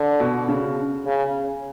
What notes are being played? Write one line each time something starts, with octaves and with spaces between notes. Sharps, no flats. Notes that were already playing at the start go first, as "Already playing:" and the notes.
Already playing: D3
B2
C#3
C#3